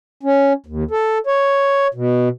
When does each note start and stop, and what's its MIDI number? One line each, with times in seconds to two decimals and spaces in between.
0.23 0.53 61
0.66 0.84 39
0.91 1.18 69
1.27 1.87 73
1.95 2.29 47